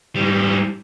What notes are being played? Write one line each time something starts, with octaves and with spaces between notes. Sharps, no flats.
G#2 G3